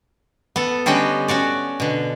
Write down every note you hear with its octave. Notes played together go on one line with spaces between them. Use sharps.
B3 A4
D3 G3 C#4 F#4 G4 D#5
C#4 F#4 C#5 D5
B2 D3